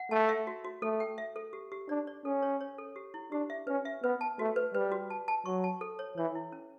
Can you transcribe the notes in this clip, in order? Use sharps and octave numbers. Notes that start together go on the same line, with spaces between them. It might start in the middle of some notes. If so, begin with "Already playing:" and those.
Already playing: F#5
A3 A5
E5
F#4
F#4
A3 A4
G5
E5
A4
G4
G4
D4 D5
D5
C#4 A4
C#5
C#5
A4
G4
E4
D4 G4
E5
C#4 B4
E5
B3 B4
A5
A3 F#4
B4
G3 B4
F#4
A5
A5
F#3 C#6
A5
A4
C#5
E3 C#5
E4
C#4